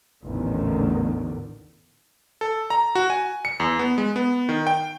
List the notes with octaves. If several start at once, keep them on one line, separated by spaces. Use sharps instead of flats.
A1 E2 A#2 D3 D#3
A4
A#5
F#4
G#5
C#7
E2
B3
G#3
B3
D#3
G5